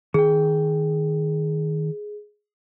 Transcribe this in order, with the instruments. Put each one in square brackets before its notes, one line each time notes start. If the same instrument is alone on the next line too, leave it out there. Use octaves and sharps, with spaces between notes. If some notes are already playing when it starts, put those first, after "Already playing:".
[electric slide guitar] D#3 G5 [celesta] G#4